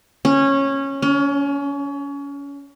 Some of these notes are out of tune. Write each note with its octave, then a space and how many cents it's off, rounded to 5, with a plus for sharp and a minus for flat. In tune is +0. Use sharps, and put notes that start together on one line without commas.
C#4 -15
C#4 +30